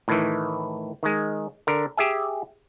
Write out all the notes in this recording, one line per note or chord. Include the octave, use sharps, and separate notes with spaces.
A2 D#3 E3
D#3 G#3
D3 A#4
G4 G#4 E5 G#5